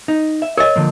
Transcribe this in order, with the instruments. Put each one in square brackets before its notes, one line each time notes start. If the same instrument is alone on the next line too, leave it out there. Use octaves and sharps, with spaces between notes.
[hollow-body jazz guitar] D#4
E5
[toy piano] A#4 D#5 [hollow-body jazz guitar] C#5
[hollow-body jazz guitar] D3 F3 A#3